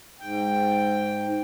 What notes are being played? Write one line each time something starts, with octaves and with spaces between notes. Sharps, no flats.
G#2 G5